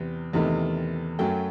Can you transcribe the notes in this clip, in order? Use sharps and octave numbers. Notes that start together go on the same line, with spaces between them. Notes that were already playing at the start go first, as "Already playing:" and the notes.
Already playing: E2 C3
E2 C3 D#3 A3
F#2 F#3 A3 G5